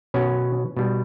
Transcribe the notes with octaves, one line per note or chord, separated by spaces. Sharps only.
B2 F#3 C#4
B2 G3